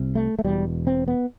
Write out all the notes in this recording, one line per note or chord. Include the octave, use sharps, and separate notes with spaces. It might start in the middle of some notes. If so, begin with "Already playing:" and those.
Already playing: C2 C3
A3
A3
E1 E2 B2 G3
C4
B3